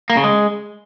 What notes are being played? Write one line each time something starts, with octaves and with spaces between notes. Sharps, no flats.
A#3
C#3
G#3